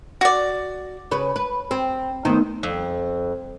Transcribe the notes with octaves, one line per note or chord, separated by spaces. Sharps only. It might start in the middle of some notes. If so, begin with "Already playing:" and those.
F#4 D5
C#3 B4
B4
C4
D#3 A3 B3 D#4 C5
F2